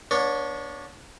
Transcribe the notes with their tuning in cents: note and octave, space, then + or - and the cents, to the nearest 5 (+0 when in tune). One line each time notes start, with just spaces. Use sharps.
B3 -40 D4 +0 C#5 +0